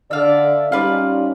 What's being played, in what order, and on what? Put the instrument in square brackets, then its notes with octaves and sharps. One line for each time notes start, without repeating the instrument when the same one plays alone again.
[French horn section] D3 D5 [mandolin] E5 F5
[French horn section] G3 C#4 D#4 [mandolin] F4 B4 D5